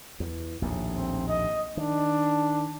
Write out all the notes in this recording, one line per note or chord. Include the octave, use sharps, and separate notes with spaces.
E2
A#1 D#2 A2
C4
D#5
D#3 D4